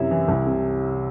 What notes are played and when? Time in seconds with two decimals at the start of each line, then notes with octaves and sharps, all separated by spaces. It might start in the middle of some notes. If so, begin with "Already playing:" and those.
Already playing: F#2 C3 E4
0.11 E3
0.28 C2
0.47 C3